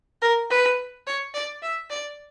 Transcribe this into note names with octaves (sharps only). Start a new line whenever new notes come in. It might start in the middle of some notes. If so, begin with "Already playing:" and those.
A#4
B4
C#5
D5
E5
D5